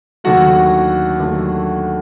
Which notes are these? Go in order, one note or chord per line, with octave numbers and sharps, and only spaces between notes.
D#2 D3 F#3 A3 F#4 F#5
D#2 D3 F#3 A3